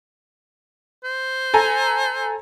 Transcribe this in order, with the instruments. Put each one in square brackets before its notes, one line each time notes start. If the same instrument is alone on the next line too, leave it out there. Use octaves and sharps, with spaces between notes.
[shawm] C5
[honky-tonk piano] A4 G#5 A#5